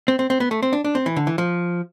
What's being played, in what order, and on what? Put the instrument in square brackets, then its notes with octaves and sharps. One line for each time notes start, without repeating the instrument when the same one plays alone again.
[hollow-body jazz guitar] C4
C4
C4
B3
A3
C4
D4
D4
C4
E3
D3
E3
F3